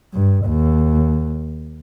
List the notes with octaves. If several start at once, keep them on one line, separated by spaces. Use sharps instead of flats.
G2
D#2